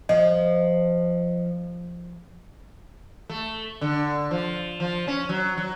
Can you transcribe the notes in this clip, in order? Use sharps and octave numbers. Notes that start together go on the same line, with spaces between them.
F3 D#5
A3
D3
F3
F3
C#4
F#3
F#3